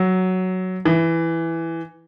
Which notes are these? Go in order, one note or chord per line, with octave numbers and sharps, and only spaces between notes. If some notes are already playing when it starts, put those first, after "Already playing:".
Already playing: F#3
E3